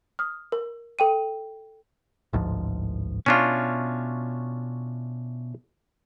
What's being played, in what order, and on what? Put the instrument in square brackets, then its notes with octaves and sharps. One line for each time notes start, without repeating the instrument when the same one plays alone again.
[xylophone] D#6 F6
A#4
A4 G5 D#7
[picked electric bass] A1 D2 G#2 F3
[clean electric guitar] B2 E4 C#5 [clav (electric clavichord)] C#4 D4 F4